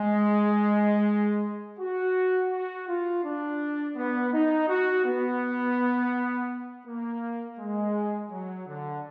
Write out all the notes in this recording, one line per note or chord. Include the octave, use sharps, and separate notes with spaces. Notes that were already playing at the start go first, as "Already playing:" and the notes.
Already playing: G#3
F#4
F#4
F4
D4
B3
D#4
F#4
B3
A#3
G#3
F#3
D3